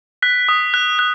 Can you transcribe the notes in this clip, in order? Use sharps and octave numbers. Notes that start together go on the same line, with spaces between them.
F#6 B6
D#6
F#6
F#6